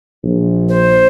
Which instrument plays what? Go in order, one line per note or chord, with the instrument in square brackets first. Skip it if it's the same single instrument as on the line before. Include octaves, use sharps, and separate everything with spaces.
[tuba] A#1
[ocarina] C5